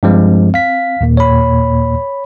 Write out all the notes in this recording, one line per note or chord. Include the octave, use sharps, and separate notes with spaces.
G2 F3 G#3 C4
F5 B6
D#2 A#2 A#3
C#5 B5